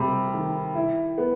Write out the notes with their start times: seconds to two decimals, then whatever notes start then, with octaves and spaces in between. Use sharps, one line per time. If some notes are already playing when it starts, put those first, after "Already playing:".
Already playing: C3 G3 A#5 B5
0.34 D#3
0.75 E4
1.18 B3